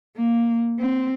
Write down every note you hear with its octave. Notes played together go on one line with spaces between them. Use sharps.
A#3
C4